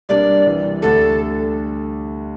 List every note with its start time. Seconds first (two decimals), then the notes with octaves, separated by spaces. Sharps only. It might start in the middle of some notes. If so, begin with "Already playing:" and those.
0.09 C2 C3 G3 A#3 D4 D5
0.46 C2 C3 E3
0.82 D2 D3 G3 D4 A4